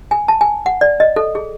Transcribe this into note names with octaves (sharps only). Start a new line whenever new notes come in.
G#5
A5
G#5
F#5
D5
D#5
A4
G#4